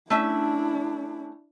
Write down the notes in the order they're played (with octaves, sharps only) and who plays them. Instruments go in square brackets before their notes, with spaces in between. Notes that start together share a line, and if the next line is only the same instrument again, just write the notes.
[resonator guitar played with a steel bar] A3 C#4 E5 [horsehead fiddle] D4 E4